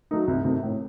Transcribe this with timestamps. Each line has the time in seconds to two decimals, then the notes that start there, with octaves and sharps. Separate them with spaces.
0.11 F#3 A3 D#4
0.28 C2
0.45 C3 D#3 A3
0.63 A2